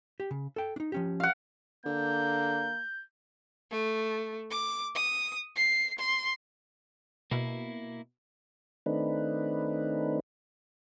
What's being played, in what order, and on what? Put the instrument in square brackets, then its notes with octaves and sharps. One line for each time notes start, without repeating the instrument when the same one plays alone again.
[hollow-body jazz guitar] G4
C#3
A4 G5
D4 D#4
F3 C#4 G4
[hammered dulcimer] F5 F#5
[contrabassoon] D3 [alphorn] A#3 [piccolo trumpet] G6
[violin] A3
D6
D#6
C7
C6
[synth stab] B2 [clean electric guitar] A#3 E4
[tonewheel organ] D#3 A3 C4 D4 D#4 B4